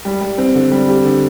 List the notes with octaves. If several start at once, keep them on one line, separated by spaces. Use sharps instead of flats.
G3
G3
C4
D3
G3
G4
D3